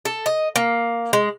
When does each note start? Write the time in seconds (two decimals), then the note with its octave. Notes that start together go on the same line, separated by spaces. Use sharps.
0.05 A4
0.26 D#5
0.56 A#3
1.13 G#3